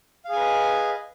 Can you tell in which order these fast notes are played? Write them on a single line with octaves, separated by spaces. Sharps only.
F5 G#4 G#5 B4 D#5